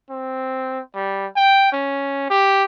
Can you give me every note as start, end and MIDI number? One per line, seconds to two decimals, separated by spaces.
0.10 0.80 60
0.95 1.26 55
1.37 1.72 79
1.72 2.30 61
2.30 2.64 67